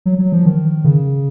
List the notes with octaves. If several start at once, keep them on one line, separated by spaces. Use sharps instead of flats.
F#3
F#3
F3
D#3
C#3